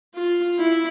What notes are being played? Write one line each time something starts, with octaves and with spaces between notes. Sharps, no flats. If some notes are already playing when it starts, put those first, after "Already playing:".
F4
E4